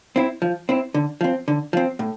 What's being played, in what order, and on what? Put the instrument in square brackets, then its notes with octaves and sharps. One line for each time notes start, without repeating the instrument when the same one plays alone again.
[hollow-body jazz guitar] C4 E4
F3
C4 E4
D3
F3 C4
D3
F3 C4
A2